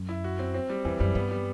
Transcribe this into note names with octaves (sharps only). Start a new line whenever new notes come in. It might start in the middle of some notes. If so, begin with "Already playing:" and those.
Already playing: F#2
E4
F#4
C4
C4
G3
E2 E3
F#2 G3
G2 B3
G3